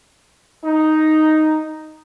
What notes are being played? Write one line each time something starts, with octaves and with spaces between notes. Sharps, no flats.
D#4